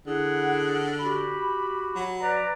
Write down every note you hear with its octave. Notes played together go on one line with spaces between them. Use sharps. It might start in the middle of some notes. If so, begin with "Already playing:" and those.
D3 E4 G#4 F#5
F#4 G4 B5
F#3
B4 D5 A#5